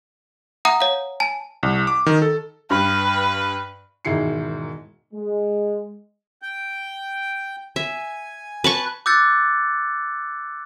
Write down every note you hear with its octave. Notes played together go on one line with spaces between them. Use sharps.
E5 F#5 A#5 D#6
C#5 F5
G#5 A5
C2
D6
D#3
A4
G2 B4
E1 G#2 D#3 E4 C7 C#7
G#3
G5
E5 G#5
B4 A5 C#6
D6 E6 F#6 G6 A6 C#7